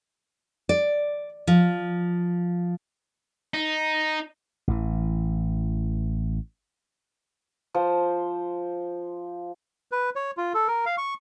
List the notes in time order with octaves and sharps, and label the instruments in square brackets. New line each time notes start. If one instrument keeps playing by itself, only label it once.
[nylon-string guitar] D5
F3
[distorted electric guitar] D#4
[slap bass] A1 E3
[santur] F3 C5
[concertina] B4
C#5
F4
A4
A#4
F5
C#6